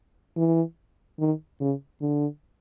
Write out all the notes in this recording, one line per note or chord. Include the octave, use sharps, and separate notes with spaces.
E3
D#3
C#3
D3